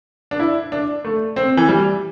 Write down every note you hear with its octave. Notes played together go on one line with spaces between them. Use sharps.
D4
E4
D4
A3
C4
E3
G3